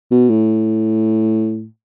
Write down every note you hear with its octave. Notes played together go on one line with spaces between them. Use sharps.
B2
A2